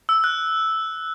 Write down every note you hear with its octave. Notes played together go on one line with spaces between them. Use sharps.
E6
F#6